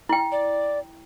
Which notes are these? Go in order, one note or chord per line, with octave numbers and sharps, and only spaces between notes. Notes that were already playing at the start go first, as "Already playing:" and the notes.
E4 G5
D5